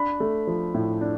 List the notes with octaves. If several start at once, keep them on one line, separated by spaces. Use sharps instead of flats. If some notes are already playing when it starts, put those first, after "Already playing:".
Already playing: D4 B5
A3
F3
A2
D4